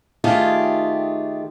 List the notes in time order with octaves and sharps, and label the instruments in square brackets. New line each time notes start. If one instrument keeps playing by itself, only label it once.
[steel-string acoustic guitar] D#3 A3 F4 G4 G#4